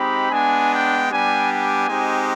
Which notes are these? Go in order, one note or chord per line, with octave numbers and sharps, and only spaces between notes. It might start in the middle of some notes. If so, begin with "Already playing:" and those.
Already playing: G#3 C4 D#4 G4 B5
G#3 B3 D4 G#5
G5
G3 B3 D4 G4 G#5
G#5
G#3 C4 D#4 G4